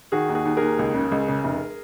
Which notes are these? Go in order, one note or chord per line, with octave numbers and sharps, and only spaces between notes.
D#3 F#4 G#4
D#2
F#4 G#4
D#2
D#2 G#4 A#4
C#2
C#3
C#2
C#3
F1